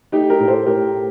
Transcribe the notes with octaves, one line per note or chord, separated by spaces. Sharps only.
A3 D#4 G4
G4 A#4
A2
A4 C5
A2 G4 A#4
A3